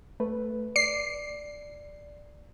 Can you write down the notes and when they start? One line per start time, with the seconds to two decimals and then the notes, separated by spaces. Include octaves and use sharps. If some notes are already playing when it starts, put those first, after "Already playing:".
0.20 A3 B4
0.76 D5 C7